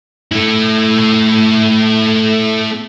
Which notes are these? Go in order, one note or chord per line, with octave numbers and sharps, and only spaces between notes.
A3 E4